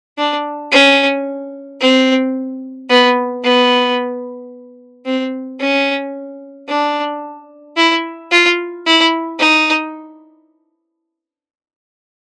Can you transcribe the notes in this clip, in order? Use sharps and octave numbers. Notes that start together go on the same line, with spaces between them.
D4
C#4
C4
B3
B3
C4
C#4
D4
E4
F4
E4
D#4